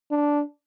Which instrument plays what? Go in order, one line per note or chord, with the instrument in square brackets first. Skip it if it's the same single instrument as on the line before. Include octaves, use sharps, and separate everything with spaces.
[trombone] D4